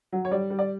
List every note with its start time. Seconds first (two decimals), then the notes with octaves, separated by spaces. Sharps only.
0.12 F#3
0.25 C#5
0.31 G3 D5
0.50 G3
0.59 D5